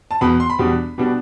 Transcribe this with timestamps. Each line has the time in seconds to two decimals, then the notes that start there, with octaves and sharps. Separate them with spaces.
0.11 A5
0.21 E2 B2 B3 B5
0.40 C6
0.50 B5
0.59 E2 B2 G3 B3 D4
0.98 B2 G3 B3 D4